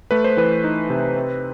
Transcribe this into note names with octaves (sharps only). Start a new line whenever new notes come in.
A3 B4
C5
E3 B4
D#4
C3
C4